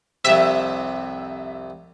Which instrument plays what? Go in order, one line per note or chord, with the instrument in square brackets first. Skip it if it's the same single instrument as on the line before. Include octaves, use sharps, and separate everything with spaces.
[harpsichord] C2 F2 C3 [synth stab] E5